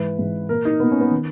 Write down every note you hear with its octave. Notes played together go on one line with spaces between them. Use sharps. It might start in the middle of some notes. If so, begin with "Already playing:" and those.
Already playing: G#2 E3 B4
G#2 E3
A#2 A#4
D#4
A#2 B3
C#4
B3
D#3